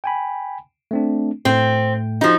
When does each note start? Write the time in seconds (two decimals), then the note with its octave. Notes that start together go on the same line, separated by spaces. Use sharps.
0.04 G5 G#5 B5
0.91 A3 C4 D4
1.45 A2 A3 C4
2.21 F3 D#4 F#4 G4